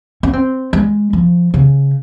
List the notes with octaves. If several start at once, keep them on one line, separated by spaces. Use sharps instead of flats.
C#4
C4
G#3
F3
C#3